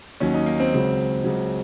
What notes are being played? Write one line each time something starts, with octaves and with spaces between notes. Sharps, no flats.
D#2 D#3 F#3 C#4
D#4
A#3
C4
C#2 C#3 F#3
C#2 C#3 F#3